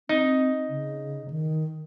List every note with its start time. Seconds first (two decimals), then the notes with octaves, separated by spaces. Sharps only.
0.09 C4 D#4
0.69 C#3
1.30 D#3